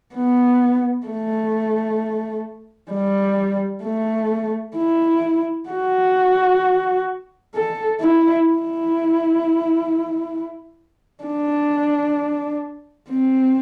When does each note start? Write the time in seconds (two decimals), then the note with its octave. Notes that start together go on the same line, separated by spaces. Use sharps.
0.14 B3
1.06 A3
2.92 G3
3.83 A3
4.76 E4
5.70 F#4
7.55 A4
8.00 E4
8.47 E4
11.24 D4
13.09 C4